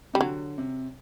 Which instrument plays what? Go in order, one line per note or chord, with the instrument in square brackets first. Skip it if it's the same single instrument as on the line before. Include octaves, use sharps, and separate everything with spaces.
[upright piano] C3 [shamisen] G3
[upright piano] D3 [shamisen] F#3
[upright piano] C3